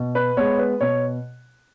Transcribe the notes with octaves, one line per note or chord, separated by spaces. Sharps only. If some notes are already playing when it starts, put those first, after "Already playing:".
Already playing: B2
B4
G#3 B3 C#5
B4
B2 C#5